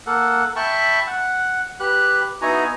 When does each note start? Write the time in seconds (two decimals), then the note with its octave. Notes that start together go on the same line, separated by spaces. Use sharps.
0.07 A#3 A4 F#5
0.56 E5 G5 A5 B5 C#6
1.07 F#5
1.80 G4 B4 F#6
2.42 B3 D#4 E4 F#4 G#5 A#5